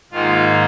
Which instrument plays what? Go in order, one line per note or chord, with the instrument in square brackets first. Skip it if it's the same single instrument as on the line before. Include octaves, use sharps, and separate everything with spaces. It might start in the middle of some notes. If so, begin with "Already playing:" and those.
[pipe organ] G#2 D#3 A#3 D#4 F4